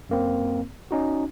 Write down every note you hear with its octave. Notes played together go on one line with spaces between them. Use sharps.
F#2 A#3 C4
C#4 D#4 F#4